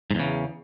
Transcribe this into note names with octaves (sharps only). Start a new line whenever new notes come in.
E2 G#2 C#3